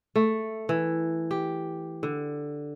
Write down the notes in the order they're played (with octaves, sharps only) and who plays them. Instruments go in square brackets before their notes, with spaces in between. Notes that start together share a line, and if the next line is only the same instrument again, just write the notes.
[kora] A3
E3
G4
D3